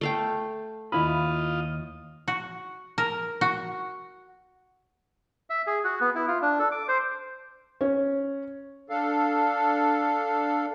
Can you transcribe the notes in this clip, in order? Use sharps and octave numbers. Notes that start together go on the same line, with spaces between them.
A3 F5 G5
D#2 E4 F4 D#5 B5
F#4
A#4
F#4
E5
G#4
F#4
B3
E4
F4
D4
A4
D6
C5
C#4
D4 A4 F5